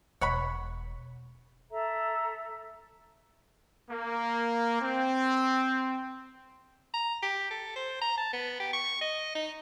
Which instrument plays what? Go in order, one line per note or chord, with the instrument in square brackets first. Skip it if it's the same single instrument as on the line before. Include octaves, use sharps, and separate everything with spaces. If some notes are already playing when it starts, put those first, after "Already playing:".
[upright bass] E1 [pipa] C#5 F#5 B5
[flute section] A4 E5 A#5
[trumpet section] A#3
C4
[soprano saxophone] A#5
G4
A4
C5
A#5
A5
B3
G4
C#6
D#5
D#4